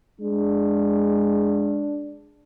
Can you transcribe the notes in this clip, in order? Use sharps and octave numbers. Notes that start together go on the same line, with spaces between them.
G#3 D4